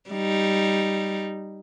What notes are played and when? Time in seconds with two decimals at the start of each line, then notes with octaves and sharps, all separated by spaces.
0.10 G3 D#4